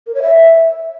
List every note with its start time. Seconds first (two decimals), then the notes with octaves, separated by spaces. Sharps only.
0.07 A#4
0.14 C#5
0.22 E5